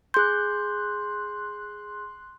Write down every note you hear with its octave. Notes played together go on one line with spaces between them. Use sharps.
G#4 C6 F#6 G6